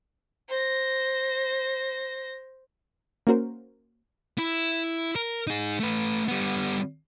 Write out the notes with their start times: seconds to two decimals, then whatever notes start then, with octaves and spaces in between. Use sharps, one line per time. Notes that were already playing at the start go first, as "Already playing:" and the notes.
0.50 C5 A#6
3.27 A#3 C#4 F#4 A#4 C5
4.38 E4
5.16 A#4
5.47 D#4 G#4
5.80 A3 B4
6.28 G3 B3